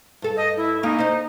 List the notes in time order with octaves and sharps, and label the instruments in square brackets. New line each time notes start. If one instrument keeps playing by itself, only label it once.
[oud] G2 A4
[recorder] D#5
E4
[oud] A#3 C#4 [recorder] D#4
[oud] C5 D#5